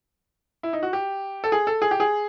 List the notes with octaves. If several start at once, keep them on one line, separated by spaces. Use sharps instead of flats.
E4
D#4
F#4
G4
A4
G#4
A4
G#4
G4
G#4